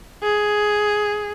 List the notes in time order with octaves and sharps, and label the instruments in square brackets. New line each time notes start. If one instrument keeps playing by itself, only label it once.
[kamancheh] G#4